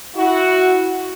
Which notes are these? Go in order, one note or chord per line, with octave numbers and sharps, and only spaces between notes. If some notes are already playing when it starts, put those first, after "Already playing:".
E4 F#4